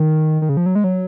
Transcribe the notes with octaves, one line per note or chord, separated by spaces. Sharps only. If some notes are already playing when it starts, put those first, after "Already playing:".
Already playing: D#3
D#3
C#3
F3
F#3
G#3
F#3